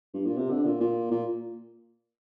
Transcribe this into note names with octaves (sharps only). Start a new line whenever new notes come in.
G2
A#2
C3
D3
A#2
A#2
A#2